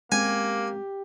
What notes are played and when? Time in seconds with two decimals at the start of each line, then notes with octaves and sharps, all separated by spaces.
0.12 G#3 A#3 C4 C#4 G4 G#5